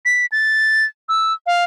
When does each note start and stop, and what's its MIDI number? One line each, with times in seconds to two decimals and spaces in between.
0.05 0.26 95
0.32 0.85 93
1.09 1.33 88
1.46 1.64 77